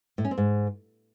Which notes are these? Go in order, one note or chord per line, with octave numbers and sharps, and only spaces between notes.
A2
C#4
C4
G#2